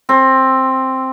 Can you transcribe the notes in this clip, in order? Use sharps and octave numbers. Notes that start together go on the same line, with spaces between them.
C4